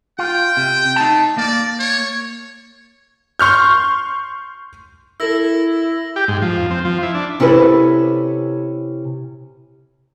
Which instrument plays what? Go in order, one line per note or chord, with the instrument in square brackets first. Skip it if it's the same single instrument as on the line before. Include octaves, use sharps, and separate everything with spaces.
[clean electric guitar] F4 [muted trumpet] G5
[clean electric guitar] C3
[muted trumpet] A3 [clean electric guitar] D#4 A5
[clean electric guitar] A#3 [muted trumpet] D5
[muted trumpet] C#5
[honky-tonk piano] C6 C#6 F6 G6
[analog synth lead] E4 [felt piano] A4 A#4 [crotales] E6 A#6 F#7
[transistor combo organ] G4
G#2
F3
F2
C4
F3
E4
D4
[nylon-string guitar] C3 C#4 E4 A4 B4